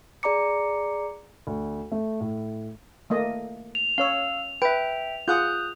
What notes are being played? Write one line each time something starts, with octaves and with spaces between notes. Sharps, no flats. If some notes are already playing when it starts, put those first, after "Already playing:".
G#4 D5 A#5 D6 C#7
D2
A3
A2
A3 A#3 D#5
F7
C#4 C#5 F5 E6
B4 E5 G5
F4 G#4 F#5 D#6 F#6 G6